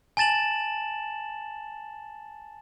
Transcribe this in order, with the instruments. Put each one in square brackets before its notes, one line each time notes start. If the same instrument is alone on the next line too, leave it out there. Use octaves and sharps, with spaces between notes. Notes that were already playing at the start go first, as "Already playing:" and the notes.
[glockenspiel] G#5 A5 A6 E7 F#7